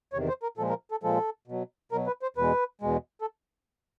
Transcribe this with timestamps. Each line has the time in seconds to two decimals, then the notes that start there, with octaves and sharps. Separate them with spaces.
0.13 E2 C3 D#3 C#5
0.28 C5
0.43 A#4
0.57 A#2 F3 G#3 A4
0.69 A#4
0.91 A4
1.03 A#2 F3 G#3 A4
1.47 B2 F#3
1.92 B2 F#3 A#4
2.07 B4
2.22 C5
2.37 E2 B2 G#3 B4
2.81 E2 B2 G#3
3.21 A4